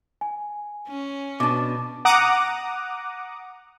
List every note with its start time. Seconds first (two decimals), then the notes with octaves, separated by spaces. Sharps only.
0.21 G#5
0.88 C#4
1.40 B2 D4 D6
2.05 F#5 A#5 D6 D#6